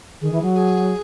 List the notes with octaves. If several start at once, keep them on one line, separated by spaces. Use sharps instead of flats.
D#3 G#4
E3
F#3
G#4